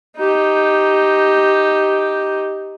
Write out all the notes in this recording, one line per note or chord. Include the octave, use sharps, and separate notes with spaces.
D#4 G4